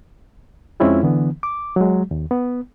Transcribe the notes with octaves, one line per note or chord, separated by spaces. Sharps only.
F2 G#3 C4 C#4 E4 F4
D3 E3 B3
D6
F#3 G#3
D#2
B3